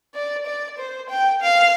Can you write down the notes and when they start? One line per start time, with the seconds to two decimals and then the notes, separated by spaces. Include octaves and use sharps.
0.14 D5
0.46 D5
0.78 C5
1.09 G5
1.42 F5